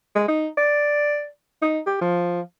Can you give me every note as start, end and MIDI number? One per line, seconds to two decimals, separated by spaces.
0.15 0.28 56
0.28 0.48 63
0.58 1.27 74
1.62 1.80 63
1.87 2.01 67
2.01 2.41 53